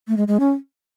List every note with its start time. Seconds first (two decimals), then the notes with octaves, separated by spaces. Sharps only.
0.08 A3
0.17 G#3
0.28 G#3
0.40 C#4